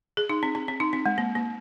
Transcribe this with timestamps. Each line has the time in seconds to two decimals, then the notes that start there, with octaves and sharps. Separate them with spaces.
0.17 G#4
0.29 D#4
0.43 C4
0.55 C4
0.68 C4
0.80 D#4
0.93 C4
1.06 G#3
1.18 A#3
1.36 A#3